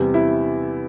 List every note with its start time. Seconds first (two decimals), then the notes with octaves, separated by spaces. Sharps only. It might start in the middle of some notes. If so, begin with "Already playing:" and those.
Already playing: E2 C3 G3
0.14 E4